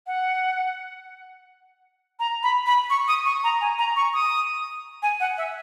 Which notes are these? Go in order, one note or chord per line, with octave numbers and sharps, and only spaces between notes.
F#5
A#5
B5
B5
C#6
D#6
C#6
A#5
G#5
A#5
C#6
D#6
G#5
F#5
E5